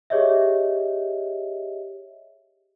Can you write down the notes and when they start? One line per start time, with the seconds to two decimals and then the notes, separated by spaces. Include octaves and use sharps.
0.10 G4 G#4 C#5 D#5 E5